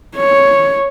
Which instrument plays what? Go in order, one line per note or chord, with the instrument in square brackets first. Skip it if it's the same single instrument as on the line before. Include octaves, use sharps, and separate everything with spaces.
[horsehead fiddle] C#5